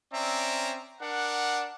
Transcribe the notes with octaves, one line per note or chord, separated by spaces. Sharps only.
C4 C#4 D5 E5 A#5
D4 A#4 F#5